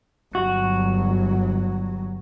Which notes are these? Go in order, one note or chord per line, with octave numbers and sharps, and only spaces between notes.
G1 F#3 F#4